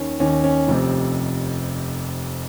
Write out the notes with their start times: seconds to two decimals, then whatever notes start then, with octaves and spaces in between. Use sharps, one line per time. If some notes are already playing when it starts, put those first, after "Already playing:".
Already playing: D#2 D#3 C#4
0.20 D#2 D#3 C#4
0.44 C#4
0.68 F1 F2 C3